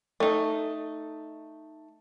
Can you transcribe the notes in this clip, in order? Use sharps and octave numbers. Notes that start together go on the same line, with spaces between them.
A3 D#4